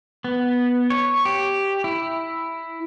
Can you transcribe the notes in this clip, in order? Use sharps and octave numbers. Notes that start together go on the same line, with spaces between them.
B3
C#5
G4
E4